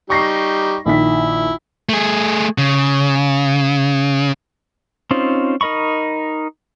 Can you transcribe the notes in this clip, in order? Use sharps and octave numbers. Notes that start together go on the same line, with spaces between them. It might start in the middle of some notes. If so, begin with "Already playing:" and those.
G3 D#4 G4 C#6 A#6 C7
A#1 D#3 E4 B6
A3 G#4
C#3
C4 C#4 D#4 F4 C5
D#4 A#4 D#5 B5 C#6